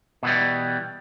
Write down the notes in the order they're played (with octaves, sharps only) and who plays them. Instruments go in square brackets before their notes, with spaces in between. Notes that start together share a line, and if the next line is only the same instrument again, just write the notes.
[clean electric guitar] B2 E3 G3